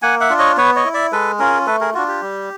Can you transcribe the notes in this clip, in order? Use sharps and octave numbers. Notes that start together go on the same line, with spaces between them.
A#3 F#5 G#5
E5 F#5
D4 F4
C#5 D#5
B3 B4 C#5
C#5 D#5
E4
D5 E5
G#3 A4 B4
C#4 F4 G#4 A#4
A3 A4 B4
G#4 A#4
D4 F4 F#4
G4
G3